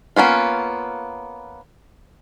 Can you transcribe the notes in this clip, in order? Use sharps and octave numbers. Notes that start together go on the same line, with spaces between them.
A#3 B3 C#4 F4